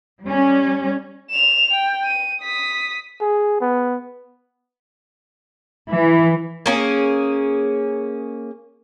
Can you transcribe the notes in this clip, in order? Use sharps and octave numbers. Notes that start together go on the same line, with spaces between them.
G3 C#4
E7 F7
G5
D#7
D#6 B6
G#4
B3
E3
A#3 C#4 G#4